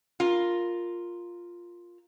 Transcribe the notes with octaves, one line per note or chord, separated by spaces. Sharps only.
F4 A#4